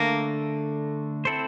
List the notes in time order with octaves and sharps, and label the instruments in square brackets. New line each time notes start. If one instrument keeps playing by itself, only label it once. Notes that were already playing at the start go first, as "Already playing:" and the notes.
Already playing: [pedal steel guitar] D3 A3 D4 A4 [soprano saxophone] A#3
[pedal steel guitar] C4 E4 A4 C5